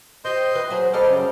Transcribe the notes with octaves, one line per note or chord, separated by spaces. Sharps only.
C4 G4 D#5 C6 G6
E3 B4
F#3 G#4 C5
G3 G4 A4 C5 D#5 F6
F#2 C#3